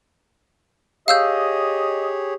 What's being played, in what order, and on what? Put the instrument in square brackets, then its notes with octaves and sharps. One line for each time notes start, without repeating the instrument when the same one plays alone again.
[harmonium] G4 G#4 C#5 [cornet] D#5 [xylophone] F5 E6 G6